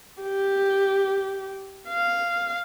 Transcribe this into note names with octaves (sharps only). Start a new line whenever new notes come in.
G4
F5